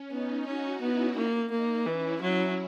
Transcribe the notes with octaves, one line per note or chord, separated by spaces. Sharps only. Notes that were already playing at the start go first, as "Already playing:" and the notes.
Already playing: C#4
B3 D#4
C#4 D#4 F#4
B3 C#4 E4
A#3
A#3 D#4
E3 C#4 E4
F#3